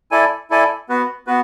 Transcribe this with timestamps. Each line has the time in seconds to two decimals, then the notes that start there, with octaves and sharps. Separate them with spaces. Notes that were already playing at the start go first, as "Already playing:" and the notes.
0.11 E4 A4 D5 G#5
0.50 E4 A4 D5 G#5
0.89 B3 F#4 B4
1.27 B3 F#4 B4